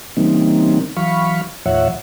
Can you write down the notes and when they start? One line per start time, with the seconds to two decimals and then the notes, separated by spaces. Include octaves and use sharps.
0.17 C#3 E3 G3 A#3 C4 D#4
0.97 E3 F#3 F5 B5 C#6
1.66 D#2 A2 F3 C#5 E5 F#5